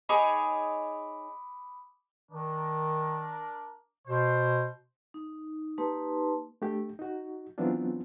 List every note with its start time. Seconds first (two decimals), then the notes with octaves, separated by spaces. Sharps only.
0.09 D#4 G#4 C#5 B5 D6 D#6
2.31 D#3 D4 A#4
4.07 B2 C5
5.14 D#4
5.78 A#3 D#4 G4 B4 A5 C6
6.62 A3 D4 G4
6.99 D#4 F#4
7.58 E3 F#3 B3 C4 D4 F4